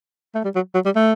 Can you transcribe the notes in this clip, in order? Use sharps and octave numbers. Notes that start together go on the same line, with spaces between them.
A3
G3
F#3
F#3
G3
A3